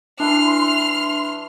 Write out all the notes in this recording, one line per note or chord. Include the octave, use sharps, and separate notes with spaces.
E3 D4 E4 B4 C6 F6